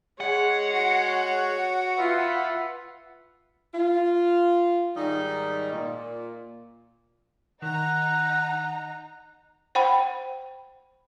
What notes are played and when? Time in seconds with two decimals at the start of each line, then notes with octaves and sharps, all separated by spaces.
0.20 G#3 G#4 C#5 F#5
0.72 F#4
1.99 F4 B4 E5
3.73 F4
4.96 G#2 D#3 G3 D#4
5.71 A#2
7.62 D#3 D#4 F#5 A#5
9.75 C5 F#5 G5 B5